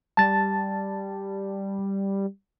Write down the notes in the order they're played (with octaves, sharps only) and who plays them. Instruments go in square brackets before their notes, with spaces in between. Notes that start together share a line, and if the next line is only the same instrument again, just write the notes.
[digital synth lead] G3 [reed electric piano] A5 A6